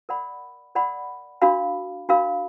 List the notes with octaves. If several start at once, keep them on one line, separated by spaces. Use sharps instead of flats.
A#4 D5 F#5 B5
A#4 D5 F#5 B5
D4 F#4 A#4 F5 B5
D4 F#4 A#4 F5 B5